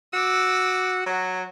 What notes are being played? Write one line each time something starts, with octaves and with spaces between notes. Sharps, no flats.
F#4 D6 E6
F#3 F#4 C#5